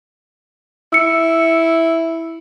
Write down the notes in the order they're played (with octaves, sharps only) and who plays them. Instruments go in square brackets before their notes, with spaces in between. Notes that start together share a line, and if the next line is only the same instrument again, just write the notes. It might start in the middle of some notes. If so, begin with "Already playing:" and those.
[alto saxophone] E4 [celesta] E6 C#7